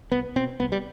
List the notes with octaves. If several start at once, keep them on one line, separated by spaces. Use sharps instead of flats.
C2 B3
B2 C4
C2 B3
G3